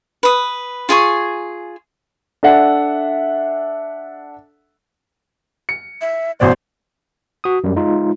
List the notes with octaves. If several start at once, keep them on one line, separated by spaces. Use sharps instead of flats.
B4 D#6
F4 G#4 G#5 C#6
D4 A4 E5 F#5
C#7
E5
A1 B2 C5 D5
F#4 D#6
F#2 G3
G#3 D#4 F4